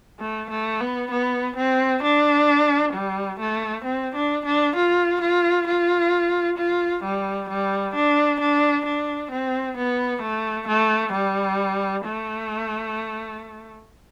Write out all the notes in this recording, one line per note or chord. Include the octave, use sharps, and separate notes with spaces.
A3
A3
B3
B3
C4
D4
G3
A3
C4
D4
D4
F4
F4
F4
F4
G3
G3
D4
D4
D4
C4
B3
A3
A3
G3
A3